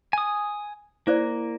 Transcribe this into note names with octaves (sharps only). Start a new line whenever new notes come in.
G#5 D#6
A#3 E4 C5 D5